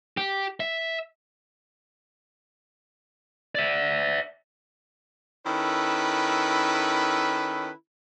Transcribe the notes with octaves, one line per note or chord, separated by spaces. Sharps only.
G4
E5
D5 E5
D#3 C#4 E4 A4 B4